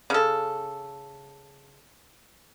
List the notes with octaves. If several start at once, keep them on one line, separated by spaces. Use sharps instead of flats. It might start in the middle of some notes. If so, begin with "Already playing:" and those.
C#3 A4